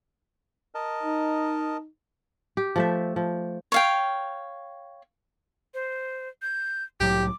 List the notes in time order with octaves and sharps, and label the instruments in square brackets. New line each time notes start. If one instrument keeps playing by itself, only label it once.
[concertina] A#4 D#5 A5
[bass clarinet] D#4
[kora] G4
F3 A3 E5
F3
[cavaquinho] C#5 F5 G5
[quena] C5
G6
[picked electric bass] C2 A2 F#3 [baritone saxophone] G4 [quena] D6